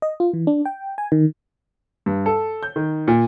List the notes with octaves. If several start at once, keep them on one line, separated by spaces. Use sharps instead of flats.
D#5
F4
E3
D4
G5
G#5
D#3
G2
A4
G6
D#3
A#2